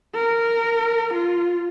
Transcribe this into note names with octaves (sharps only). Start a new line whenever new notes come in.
A#4
F4